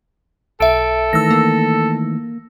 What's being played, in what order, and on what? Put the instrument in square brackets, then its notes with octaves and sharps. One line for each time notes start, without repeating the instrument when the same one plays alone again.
[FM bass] B1 [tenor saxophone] A4 [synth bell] E5 D7
[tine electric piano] D#3 E3 A3 [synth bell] E6 A#6
[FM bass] A#3